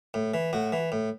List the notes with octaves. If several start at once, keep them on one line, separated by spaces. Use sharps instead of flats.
A2
E3
A2 F#4
E3
A2